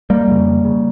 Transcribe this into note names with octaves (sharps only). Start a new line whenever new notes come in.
G3 A#3
F2 C#3
C#3